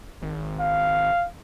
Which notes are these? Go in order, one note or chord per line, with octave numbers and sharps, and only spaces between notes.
G#1
F5